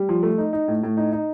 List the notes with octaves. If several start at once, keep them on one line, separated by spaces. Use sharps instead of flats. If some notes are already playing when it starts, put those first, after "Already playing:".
Already playing: G3
F3
A3
D#4
D#4
A2
A2
D#4
D#4